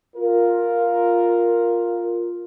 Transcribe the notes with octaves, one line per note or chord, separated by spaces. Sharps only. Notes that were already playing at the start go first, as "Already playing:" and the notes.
F4 A#4